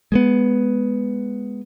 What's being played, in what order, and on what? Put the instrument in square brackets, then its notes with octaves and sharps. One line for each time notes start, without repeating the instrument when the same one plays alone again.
[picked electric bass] G#3 A3 B3